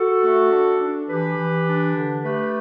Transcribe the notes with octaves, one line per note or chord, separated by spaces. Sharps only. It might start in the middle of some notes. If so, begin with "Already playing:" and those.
Already playing: F#4 A4
A3
D4
D4
E3 G4 B4
E3
D4
D3
A3 G4 B4